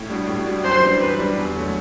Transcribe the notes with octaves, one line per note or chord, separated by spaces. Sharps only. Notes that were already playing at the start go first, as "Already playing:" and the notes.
Already playing: A2
G3 D4 F#4
A2
G3 D4 F#4
F#2 C5
E3 G3 D4
F#2 B4
E3 G3 D4
E2
D3 F#3 A3